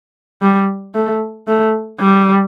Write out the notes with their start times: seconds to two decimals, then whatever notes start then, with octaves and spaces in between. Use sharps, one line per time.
0.42 G3
0.95 A3
1.47 A3
2.00 G3